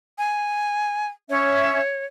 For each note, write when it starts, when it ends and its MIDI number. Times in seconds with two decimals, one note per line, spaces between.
0.18 1.07 80
1.30 1.79 61
1.30 2.05 73
1.30 1.79 76